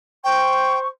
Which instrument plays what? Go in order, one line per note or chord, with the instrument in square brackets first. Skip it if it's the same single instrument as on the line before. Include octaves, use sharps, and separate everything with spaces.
[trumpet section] C5 [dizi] G5 [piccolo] C#6